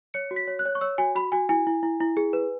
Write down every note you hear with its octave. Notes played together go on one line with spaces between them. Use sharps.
C#5 C#7
F#4
B6
C#5
F#6
C#5
C#6
C#5 E6
F#4 G#5
F#4 B5
F#4 G#5
E4 G#5
E4
E4
E4
G#4
B4